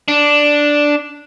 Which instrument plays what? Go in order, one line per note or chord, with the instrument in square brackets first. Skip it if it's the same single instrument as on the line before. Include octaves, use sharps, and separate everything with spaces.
[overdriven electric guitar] D4